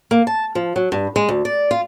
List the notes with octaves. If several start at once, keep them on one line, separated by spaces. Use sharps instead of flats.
A#3
A5
F3
F#3
G2
G#3
D2
D5
F4